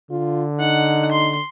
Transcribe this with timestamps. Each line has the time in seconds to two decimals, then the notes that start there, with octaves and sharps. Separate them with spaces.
0.11 D3 F4
0.60 D#4 F#5
1.12 C6